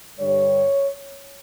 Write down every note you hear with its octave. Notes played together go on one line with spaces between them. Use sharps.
G2 D3 G3 C#5